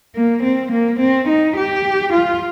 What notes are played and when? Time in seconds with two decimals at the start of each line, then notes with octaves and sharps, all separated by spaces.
0.15 A#3
0.43 C4
0.72 A#3
1.00 C4
1.28 D#4
1.57 G4
2.13 F4